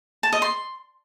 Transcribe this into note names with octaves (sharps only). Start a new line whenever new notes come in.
A5
D#5
C6